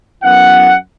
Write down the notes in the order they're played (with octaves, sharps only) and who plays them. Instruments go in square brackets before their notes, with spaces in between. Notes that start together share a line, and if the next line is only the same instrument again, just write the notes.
[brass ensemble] F#2 E3 B3 F#5